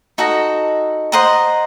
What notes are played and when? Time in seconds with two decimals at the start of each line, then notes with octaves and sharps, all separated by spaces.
0.18 D#4 F#4 A4 D#5
1.12 C5 D#5 F#5 A#5